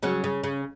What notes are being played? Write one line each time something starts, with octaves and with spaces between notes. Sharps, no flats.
C#3 F#3 C#4
C#3
C#3